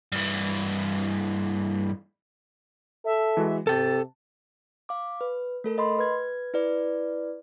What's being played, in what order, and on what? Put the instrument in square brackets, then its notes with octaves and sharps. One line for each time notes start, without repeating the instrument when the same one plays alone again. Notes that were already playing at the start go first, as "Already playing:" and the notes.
[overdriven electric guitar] G2 E3
[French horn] A4 [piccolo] E5
[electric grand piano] E3 G#3 F#4
[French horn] C3 [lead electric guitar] A4 G5 [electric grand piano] A5 [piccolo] A6
[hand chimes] F5 D6
B4
A3 A4 A#4
D#5 B5 C6
B4 G#6
E4 B4 D5